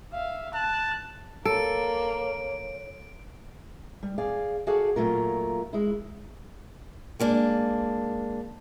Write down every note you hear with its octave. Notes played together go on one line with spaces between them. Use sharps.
E5 F5
A5 F#6
A#3 A4 C#5 D7
G3
G#4 D5 F5
F#4 G#4 A4 D5 F5 F#5
A#2 F#3 A3 F4 A#4
G#3 E4
G#3 A#3 D4